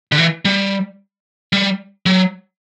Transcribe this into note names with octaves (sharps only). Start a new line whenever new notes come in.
D3
E3
G3
G3
F#3